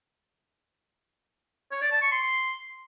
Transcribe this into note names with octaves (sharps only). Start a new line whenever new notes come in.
C#5
D5
A5
C#6
C6